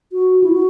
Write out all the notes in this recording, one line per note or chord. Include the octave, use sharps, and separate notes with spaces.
F#4
E4
F#4